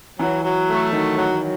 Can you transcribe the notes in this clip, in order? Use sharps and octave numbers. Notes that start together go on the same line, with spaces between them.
E3 F#3
F#3
A3
D#3 F#3
F#3
F#3